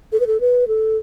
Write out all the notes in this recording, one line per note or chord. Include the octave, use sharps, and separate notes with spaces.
A4
B4
A4
B4
A4